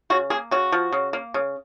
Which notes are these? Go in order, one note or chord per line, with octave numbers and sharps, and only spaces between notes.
C#3 F#4
A#3 G#4
C#3 F#4
F3
C#3
A#3
C#3